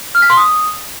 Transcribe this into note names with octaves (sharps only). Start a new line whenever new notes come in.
F6
B6
C6
D#6